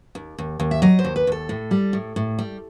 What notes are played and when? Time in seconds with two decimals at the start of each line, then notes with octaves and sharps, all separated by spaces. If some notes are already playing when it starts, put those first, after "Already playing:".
0.15 D#2
0.38 D#2
0.60 D#2
0.71 E5
0.82 F#3 D#5
0.99 C5
1.05 D#2
1.16 B4
1.27 D#2 A4
1.49 A2
1.71 G3
1.93 A2
2.16 A2
2.39 G3